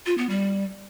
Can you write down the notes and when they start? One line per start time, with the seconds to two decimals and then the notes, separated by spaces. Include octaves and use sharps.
0.06 F4
0.18 B3
0.29 G3